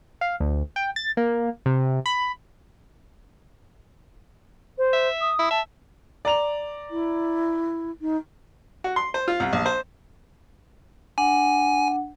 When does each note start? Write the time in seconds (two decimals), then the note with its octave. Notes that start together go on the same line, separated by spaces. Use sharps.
0.21 F5
0.40 D2
0.76 G5
0.96 A6
1.17 A#3
1.66 C3
2.06 B5
4.78 C5
4.93 E5
5.21 D#6
5.39 E4
5.51 E5 A5
6.25 D5 A#5 F7
6.91 E4
8.02 D#4
8.84 F#4
8.96 C6
9.14 C5
9.28 F4
9.40 C2
9.53 A#1
9.66 C5
11.18 D4 F#5 G#5